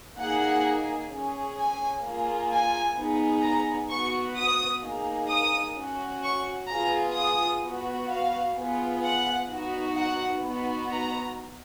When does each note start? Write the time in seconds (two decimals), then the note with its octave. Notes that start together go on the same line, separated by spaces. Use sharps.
0.17 A#3 D#4 G#4 F#5
1.10 C#4 G#4
1.57 G#5
2.04 A#3 F4 G#4
2.51 G#5
2.97 B3 D#4 G#4
3.43 A#5
3.90 B3 F#4 C#6
4.37 D#6
4.83 A#3 D#4 G#4
5.30 D#6
5.77 C#4 F#4
6.23 C#6
6.69 B3 F4 G#4 A#5
7.16 D#6
7.63 B3 F#4
8.10 F5
8.57 B3 F4 G#4
9.03 F#5
9.49 B3 D#4 F#4
9.96 F#5
10.43 B3 D#4 F#4
10.89 A#5